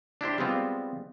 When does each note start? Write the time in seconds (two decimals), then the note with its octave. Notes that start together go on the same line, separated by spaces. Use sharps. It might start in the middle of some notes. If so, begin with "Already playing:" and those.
0.21 D4 E4 G4 C5
0.38 G3 G#3 B3 C4 F4